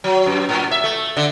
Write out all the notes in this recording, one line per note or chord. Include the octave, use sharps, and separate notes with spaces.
F#3
F#2
A2
E5
A3
D3